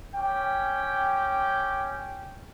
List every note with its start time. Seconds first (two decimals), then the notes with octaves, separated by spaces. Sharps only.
0.14 C#4 G4 G5